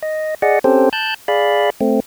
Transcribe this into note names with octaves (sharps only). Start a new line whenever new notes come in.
D#5
G#4 D5 D#5 F#5
C4 C#4 G4 A4 C5
A5 F#6 G6
G#4 D5 F5 B5
A3 C4